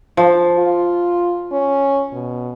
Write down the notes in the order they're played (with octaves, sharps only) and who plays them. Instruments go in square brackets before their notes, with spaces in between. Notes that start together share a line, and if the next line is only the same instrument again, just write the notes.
[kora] F3
[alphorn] F4
C#4
B2